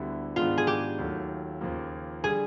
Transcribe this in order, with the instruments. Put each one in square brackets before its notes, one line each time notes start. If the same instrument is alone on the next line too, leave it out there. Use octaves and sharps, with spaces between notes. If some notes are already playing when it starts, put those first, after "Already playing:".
Already playing: [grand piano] D2 D3 G3 B3 E4
[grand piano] G#2 D#3 G#3 B3 D4 [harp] F4
[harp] G#4
G4
[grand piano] D#2 D#3 F#3 A3
D#2 C#3 F3 A#3
[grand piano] D3 G3 [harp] G#4